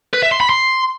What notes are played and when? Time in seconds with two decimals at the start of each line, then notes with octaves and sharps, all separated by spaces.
0.14 B4
0.23 E5
0.32 C6
0.40 B5
0.49 C6